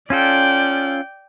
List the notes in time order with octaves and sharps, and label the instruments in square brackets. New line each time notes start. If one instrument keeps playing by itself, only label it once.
[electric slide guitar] C#4 F4 A4 [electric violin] D5 G5